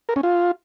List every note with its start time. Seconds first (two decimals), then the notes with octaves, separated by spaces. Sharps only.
0.09 A#4
0.16 C#4
0.23 F4